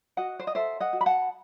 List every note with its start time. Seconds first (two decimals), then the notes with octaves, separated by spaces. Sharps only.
0.17 F#4 D#5 F#5
0.39 C5
0.47 D#5
0.55 A4 C5 E5
0.80 D#5 F#5
0.93 F#4
1.01 B5
1.06 F#5 A5